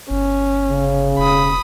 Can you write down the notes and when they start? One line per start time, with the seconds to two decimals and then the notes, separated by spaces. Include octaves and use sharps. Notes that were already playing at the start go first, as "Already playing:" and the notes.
0.10 G1 C#4
0.69 C#3
1.18 E1 B5 D#6